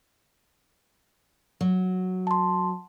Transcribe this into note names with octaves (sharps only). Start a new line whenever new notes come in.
F#3
A5 C6